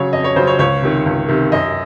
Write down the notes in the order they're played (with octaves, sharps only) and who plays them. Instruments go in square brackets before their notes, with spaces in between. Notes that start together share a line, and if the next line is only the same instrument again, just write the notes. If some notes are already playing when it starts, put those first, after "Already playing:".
Already playing: [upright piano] C#3 F#3 C#5
F2 D#5
C#5
C#3 F#3 C5
C#5
C#2 C#5
C3 D#3
C#2
C3 D#3
F#2 D#5